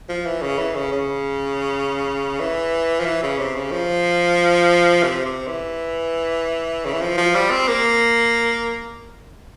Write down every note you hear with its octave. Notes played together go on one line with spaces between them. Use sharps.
F3
E3
C#3
E3
C#3
C#3
E3
F3
E3
C#3
C3
C#3
F3
C3
C3
E3
C#3
E3
F3
F3
G3
C4
A#3